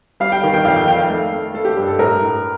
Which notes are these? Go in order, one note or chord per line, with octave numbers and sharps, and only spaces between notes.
G3 F5
G5
D#3
G5
F2 F5
G5
D#3 G5
F5
A3
A3
A3 A4
G4
G2
A4
A2 A#4
A2